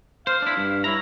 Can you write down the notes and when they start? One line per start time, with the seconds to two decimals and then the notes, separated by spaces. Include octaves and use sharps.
0.27 C5 F5
0.42 D4 E4
0.57 G2
0.84 E4 C#5 A#5